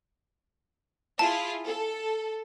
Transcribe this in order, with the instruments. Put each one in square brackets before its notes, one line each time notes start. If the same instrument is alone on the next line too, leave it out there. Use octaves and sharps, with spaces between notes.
[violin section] E4 F4 G#4 [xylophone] A5
[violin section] A4